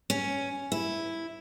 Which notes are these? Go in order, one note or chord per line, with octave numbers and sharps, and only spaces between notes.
C#4
E4